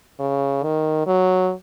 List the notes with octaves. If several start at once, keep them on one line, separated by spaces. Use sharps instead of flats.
C#3
D#3
F#3